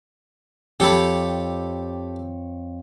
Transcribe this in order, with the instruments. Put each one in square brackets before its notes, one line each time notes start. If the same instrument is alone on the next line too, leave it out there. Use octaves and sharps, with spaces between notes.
[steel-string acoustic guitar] F2 C#5 [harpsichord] G4 A4 B5